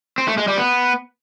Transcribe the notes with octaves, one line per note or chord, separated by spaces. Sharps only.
C4
A3
G#3
G3
B3